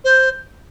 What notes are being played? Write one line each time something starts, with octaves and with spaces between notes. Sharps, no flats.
C5